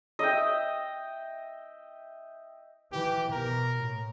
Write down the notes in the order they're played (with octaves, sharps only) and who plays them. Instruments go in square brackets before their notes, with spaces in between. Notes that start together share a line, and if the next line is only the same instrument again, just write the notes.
[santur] D#5 E5 G5
[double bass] E3 [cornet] G4
[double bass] B2 [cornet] A#4
[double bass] A2